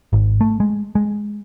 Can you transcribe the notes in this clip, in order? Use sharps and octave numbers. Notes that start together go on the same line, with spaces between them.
G#1
A3
G#3
G#3